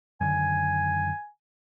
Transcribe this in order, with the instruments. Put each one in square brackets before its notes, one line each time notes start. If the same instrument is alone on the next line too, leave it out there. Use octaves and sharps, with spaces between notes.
[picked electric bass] F#2 D3 D#3 [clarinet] G#5